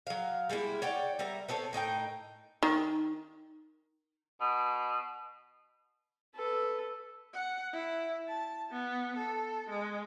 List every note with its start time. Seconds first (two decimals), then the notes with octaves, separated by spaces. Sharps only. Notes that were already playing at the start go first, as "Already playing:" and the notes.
0.07 F#3 F5
0.50 G3 G#3 A#3 E4
0.82 C#5 D5 F#5 G5
1.19 G3 A#4 E5 A#5
1.49 B3 C4 A4 C#5
1.73 A2 D#4 A#4 G5
2.63 D#3
4.41 B2
6.36 A4 B4
7.34 F#5
7.73 E4
8.28 A5
8.72 B3
9.17 A4
9.70 G#3